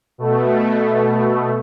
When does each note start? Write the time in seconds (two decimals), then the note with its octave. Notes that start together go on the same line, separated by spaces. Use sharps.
0.18 B2 A3